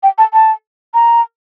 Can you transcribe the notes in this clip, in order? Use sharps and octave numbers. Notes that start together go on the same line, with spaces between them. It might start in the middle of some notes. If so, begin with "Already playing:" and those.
G5
A5
A5
A#5